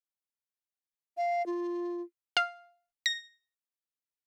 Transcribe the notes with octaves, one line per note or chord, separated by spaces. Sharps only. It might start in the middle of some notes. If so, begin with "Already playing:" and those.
F5
F4
F5
A#6